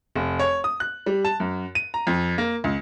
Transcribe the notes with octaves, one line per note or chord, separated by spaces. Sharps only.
F1
C#5
D#6
F#6
G3
A5
F#2
D#7
A#5
F2
A#3
C#2